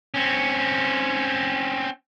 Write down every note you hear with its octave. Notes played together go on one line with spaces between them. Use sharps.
C4 C#4